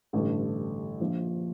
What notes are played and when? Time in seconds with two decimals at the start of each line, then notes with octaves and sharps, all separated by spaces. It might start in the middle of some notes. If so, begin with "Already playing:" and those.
0.13 A1 G2 D3
1.00 A#1 A#2 F3